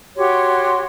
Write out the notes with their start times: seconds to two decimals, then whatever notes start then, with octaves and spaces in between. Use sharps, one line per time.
0.17 F#4 G4 C#5 C6